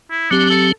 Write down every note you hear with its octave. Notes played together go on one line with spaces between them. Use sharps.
E4
F#3 C4 D4 G4
A4